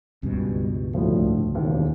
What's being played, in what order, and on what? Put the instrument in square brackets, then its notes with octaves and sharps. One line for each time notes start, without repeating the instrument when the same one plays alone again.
[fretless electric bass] C#2 G2 B2 [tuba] G3
[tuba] D2 [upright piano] A2 F3
[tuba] E1 [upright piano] D#2